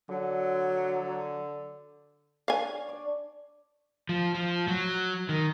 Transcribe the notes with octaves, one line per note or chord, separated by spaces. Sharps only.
D3 F#3
D4 C#5 F5 G#5
D5
F3
F3
F#3
D#3